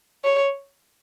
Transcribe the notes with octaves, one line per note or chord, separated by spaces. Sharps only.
C#5